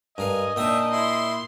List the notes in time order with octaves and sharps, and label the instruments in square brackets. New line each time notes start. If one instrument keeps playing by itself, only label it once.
[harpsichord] G2 A#4 F5 [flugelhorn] D#5 [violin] G#5
[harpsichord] A#2 G5 D#6 [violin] D4 D#4 [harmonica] E5
[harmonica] E4 [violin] C6